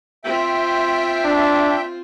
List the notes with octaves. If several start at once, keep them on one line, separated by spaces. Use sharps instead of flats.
C4 F4 E5 G5
D4